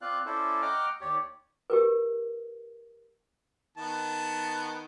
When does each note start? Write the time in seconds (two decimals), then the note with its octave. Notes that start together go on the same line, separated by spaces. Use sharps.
0.02 C4 F4 D5 F5 F#6
0.26 C#4 E4 A4 C5 D5
0.62 D#5 F#5 G5 A#5 D6 F6
1.01 D#2 G4 C#5 D5
1.70 G4 A#4 B4
3.77 D#3 B3 A5